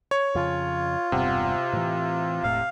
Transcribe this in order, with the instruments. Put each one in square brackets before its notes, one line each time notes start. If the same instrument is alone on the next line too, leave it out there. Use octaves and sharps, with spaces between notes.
[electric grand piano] C#5
[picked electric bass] F2 C#3 [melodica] F4
[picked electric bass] E1 G2 B3 [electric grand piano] C3
[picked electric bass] A2 E3
[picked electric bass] E1 A2 [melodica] F5